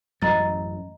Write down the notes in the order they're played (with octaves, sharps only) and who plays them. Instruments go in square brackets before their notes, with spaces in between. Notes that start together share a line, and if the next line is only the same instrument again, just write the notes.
[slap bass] A1 F#2 F#3 [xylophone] D#5 A#5 A6